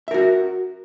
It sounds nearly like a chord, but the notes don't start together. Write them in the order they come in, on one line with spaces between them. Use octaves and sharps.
E5 A#4 F#4